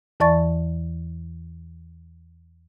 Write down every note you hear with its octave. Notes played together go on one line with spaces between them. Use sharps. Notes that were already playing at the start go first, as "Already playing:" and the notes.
E2 E3 D5 A5 C#6 A6